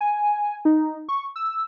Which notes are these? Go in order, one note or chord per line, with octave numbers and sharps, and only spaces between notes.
G#5
D#4
C#6
E6